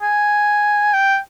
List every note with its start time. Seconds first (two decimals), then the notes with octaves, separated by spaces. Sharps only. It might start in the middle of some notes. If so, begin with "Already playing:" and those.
0.02 G#5
0.94 G5